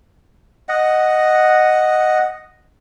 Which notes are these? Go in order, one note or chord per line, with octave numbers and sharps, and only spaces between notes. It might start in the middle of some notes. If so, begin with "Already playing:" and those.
D#5 F#5